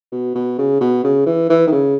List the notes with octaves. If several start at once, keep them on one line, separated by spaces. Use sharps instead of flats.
B2
B2
C#3
B2
C#3
E3
E3
D#3
C#3